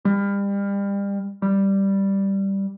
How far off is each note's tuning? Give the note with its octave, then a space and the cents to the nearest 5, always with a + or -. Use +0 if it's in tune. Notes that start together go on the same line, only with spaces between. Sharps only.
G3 +30
G3 +0